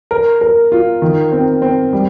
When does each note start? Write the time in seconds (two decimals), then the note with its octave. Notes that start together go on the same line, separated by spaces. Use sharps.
0.11 A#4
0.41 A#4
0.72 F4
1.02 D#3
1.32 C4
1.62 C4
1.93 G3